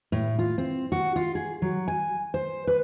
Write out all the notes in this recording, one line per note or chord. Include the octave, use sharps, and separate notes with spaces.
A2
F4
C4
F#4
F4
G#4
F#3
G#5
C5
B4